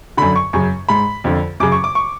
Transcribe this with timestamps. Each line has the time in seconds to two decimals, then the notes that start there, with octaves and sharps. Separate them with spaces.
0.17 F#2 D3 B5
0.36 C#6
0.53 F#2 C#3 C#6
0.89 G#2 B5
1.24 F2 D3
1.60 F#2 C#3 D6
1.72 C#6
1.84 D6
1.95 C#6